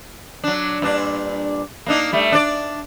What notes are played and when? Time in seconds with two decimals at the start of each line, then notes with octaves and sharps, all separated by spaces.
0.44 F#3 D4
0.82 G2 A#2 D4
1.86 A#3 D4 D#4
2.13 G3 A3
2.32 D4 D5